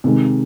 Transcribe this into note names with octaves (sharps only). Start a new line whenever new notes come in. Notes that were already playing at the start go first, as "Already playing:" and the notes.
C3 D#3 G#3